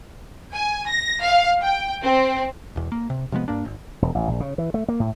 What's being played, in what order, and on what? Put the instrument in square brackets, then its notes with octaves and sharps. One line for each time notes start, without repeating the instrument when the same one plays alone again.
[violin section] G#5
A#6
F5
G5
C4
[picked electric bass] E1 E2
A#3
C3
C3 F3 G#3 B3
G2 A#3 D4
G#1
[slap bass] E1
A1
A#1
C#3
E3
A3
A#3
A2